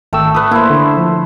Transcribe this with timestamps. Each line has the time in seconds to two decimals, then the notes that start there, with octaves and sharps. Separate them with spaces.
0.13 G#1 A3 G5 E6
0.34 A4 B4 D#6
0.51 A#3 E4 C5
0.70 D3
0.97 F3